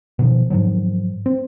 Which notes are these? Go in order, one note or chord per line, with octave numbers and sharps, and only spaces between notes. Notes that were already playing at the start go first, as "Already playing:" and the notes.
B2 D#3 F3
G#2 D#3 F3 F#3
C4